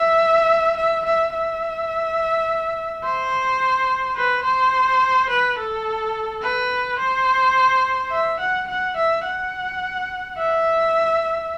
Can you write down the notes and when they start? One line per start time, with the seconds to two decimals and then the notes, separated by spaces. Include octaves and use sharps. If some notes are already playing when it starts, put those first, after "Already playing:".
Already playing: E5
0.77 E5
1.05 E5
1.34 E5
3.04 C5
4.16 B4
4.44 C5
5.29 B4
5.58 A4
6.42 B4
6.99 C5
8.12 E5
8.40 F#5
8.68 F#5
8.97 E5
9.25 F#5
10.38 E5